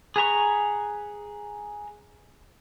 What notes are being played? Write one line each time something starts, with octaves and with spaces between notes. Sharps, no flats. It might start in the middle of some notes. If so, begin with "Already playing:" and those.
G#4 B4 A#5 C#6